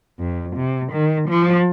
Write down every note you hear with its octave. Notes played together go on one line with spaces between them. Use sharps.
F2
C3
D#3
F3